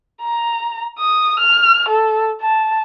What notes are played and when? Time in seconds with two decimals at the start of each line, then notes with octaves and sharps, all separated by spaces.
0.23 A#5
0.99 D#6
1.40 F6
1.89 A4
2.41 A5